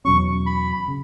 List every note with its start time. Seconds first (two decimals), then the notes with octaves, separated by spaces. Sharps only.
0.05 E2 B2 F#3 C#4 C#6
0.46 B5
0.88 C#3